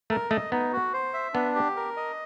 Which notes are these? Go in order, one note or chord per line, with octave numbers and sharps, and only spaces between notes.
A3 A#4
A3 D#5
B3 D#4
F#4
C5
E5
B3 D4
G4
A#4
D#5